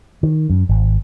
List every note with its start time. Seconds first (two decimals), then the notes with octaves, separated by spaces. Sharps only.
0.23 D#3
0.50 F#2
0.69 G#1